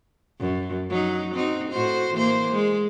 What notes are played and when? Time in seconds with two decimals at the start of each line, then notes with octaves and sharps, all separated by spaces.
0.40 F#2
0.90 F#3 D#4
1.34 C4 D#4 F#4
1.70 A2 F#4 C5
2.13 E3 A#3 C5
2.53 G#3